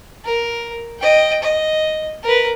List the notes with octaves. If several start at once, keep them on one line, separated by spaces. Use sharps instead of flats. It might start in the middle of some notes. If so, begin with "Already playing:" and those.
A#4
D#5 G5
D#5
A#4 B4